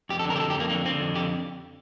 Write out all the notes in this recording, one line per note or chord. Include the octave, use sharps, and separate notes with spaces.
F2 G4
A4
D3
A#4
G4
F2 A4
G4
F2 A#3
D3 A#3
D3 C4
F2
D3 G4